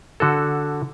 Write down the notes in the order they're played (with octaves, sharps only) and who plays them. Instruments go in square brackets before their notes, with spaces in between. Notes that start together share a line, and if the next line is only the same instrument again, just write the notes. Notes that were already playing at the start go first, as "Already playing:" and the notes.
[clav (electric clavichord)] D3 F#4 A4